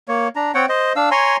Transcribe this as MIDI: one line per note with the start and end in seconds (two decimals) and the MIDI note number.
0.08 0.28 58
0.08 0.28 73
0.36 0.52 62
0.36 0.52 82
0.54 0.66 60
0.54 0.66 73
0.54 0.66 78
0.54 0.66 79
0.69 0.93 72
0.69 0.93 75
0.96 1.10 62
0.96 1.10 77
0.96 1.10 88
1.11 1.37 73
1.11 1.37 80
1.11 1.37 82
1.11 1.37 84